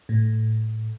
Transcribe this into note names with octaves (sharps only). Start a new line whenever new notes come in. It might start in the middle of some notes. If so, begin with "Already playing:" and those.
A2